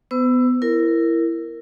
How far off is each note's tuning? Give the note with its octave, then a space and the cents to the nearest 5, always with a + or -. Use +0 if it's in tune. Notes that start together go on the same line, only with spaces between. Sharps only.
B3 +20 C5 -45 E6 +15
E4 +15 A#4 -10